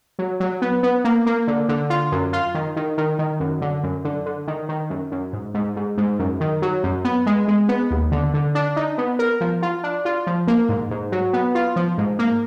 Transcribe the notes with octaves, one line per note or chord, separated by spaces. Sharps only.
F#3
F#3
B3
B3
A#3
A#3
D3
D3
F4
F#2
F4
D#3
D#3
D#3
D#3
F#2
D3
F#2
D3
D3
D#3
D#3
F#2
F#2
G#2
G#2
G#2
G#2
F#2
D#3
F#3
F#2
B3
G#3
G#3
B3
D#2
D3
D3
D4
D#4
B3
A#4
F3
F4
D4
F4
F3
A#3
G#2
G#2
F#3
B3
F4
F3
G#2
A#3